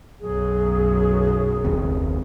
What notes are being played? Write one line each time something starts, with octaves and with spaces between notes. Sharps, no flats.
B1 F#2 F#3 G#4
F#1 D#2 C4